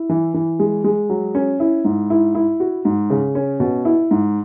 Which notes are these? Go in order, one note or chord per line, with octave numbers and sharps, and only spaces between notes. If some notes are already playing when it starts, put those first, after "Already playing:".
Already playing: E4
E3
E3
G#3
G#3
F#3
C#4
E4
G#2
E4
E4
F#4
G#2
C#3
C#4
B2
E4
G#2